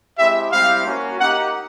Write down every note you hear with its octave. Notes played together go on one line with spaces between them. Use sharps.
G#3 C4 E4 G4 E5
G3 C4 E4 G4 F5
A#3 C#4 F#4
A#3 D#4 G4 F#5